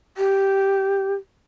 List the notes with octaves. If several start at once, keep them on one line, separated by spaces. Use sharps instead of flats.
G4